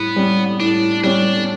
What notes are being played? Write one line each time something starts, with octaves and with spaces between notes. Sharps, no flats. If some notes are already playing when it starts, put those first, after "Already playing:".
Already playing: A2 G3 B3
G3 C#4
A2 D4
G3 C#4 D4